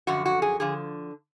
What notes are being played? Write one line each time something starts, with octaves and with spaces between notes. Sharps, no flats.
F#2 D3 F3 F#4
F#4
G#4
D3 F3 G#4